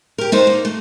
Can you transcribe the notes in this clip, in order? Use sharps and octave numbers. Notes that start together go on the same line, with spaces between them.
G4 A#4
D4 D#4 C5
A#3
A3